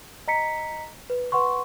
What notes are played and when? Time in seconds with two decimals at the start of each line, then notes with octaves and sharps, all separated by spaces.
0.28 D#5 A#5 B6 C#7
1.10 B4
1.32 B4 F#5 C6 C#6